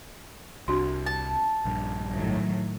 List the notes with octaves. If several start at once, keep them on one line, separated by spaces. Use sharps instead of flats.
C2 D4 F#4 C6
A5
A#1 G2
A2 D#3 F#3